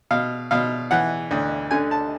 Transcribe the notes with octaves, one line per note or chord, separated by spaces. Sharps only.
B2 F5
B2 F5
E3 F#5
D2
D3 G#5
A5